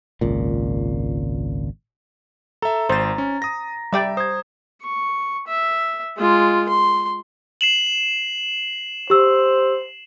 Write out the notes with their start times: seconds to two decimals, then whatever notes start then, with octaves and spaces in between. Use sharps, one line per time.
0.21 G#1 C#2 A#2
2.62 A4 E5 A#5
2.89 G#1 C5 A6
3.18 C#4
3.42 D#6 A#6
3.93 G3 D5 E5 G5
4.17 C5 D#6 G#6
4.82 C#6
5.47 E5
6.17 G#3 F4
6.69 C6
7.61 C7 E7 F#7
9.10 G4 C5 E6